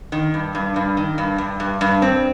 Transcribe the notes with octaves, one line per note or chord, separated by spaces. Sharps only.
D#3
G2
G2
G2
D#3
G2
G2
G2
G2
C4